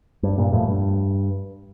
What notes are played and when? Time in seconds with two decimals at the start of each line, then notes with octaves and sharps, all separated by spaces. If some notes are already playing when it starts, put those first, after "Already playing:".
0.23 G2
0.38 G2 A#2
0.53 F2 A2
0.68 G2